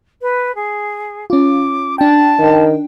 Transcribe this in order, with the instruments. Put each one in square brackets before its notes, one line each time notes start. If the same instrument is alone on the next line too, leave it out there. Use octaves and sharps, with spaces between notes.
[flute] B4
G#4
[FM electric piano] C#4 F4 [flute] D6
[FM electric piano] D4 G5 [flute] A5
[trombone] D#3